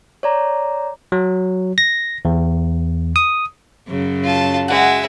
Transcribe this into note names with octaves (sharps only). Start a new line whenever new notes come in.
C#5 D5 A#5
F#3
A#6
E2
D#6
F#2 C#3 F#3
F4 A5
G#3 F#4 E5